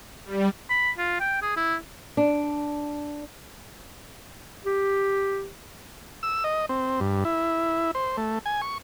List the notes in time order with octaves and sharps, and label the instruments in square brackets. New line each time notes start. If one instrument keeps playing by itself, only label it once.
[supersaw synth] G3
[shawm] B5
F4
G5
G#4
E4
[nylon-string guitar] D4
[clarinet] G4
[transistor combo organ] E6
D#5
C4
G2
E4
C5
A3
G#5
C#6